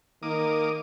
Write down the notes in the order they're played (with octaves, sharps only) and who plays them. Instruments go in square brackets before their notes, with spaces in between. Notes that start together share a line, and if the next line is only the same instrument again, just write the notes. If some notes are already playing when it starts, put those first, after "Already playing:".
[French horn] D#3 [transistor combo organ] A#3 D6 D#6